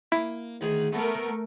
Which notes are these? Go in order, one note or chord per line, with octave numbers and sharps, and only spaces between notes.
A#3 E4
D2 D#3 G#4
A3 B3 A#4